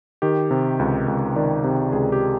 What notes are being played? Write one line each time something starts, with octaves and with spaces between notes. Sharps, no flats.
D#3 G4
C3
C#2
C#2
D#3 D5
C3
C#2 G#4
G4